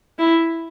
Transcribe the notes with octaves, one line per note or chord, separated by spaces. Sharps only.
E4